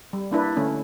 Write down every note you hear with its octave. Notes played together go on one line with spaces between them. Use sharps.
G3
A#3 D4 E4 B4
D3 A3 C#4